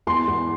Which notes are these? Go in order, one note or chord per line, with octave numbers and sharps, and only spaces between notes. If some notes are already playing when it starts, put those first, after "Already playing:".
E2 C6
E2